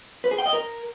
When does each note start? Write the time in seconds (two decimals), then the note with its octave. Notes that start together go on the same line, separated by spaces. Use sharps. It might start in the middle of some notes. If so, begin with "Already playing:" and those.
0.24 B4
0.31 G#4
0.38 G5
0.46 D#5
0.53 A#4